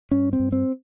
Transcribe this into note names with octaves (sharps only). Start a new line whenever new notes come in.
G2 C#4
C4
G2
C4